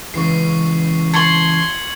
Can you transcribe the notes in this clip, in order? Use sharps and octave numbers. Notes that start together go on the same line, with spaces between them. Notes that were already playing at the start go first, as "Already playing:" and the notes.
C#3 E3 G#3 C#6 C7
A5 C6 C#6 G#6 C#7 F#7